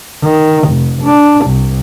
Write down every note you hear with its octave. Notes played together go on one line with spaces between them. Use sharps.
D#3
F1
D4
C2